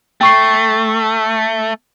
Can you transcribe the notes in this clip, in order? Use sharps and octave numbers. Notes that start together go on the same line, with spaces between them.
A3 G5 C#6 C7